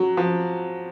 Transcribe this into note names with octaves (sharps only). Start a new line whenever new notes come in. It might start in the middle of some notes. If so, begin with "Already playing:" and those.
Already playing: F#3
F3